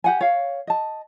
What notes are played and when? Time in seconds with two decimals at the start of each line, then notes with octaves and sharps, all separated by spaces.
0.04 G4 F#5 G#5
0.21 C#5 F5
0.67 D#5 A5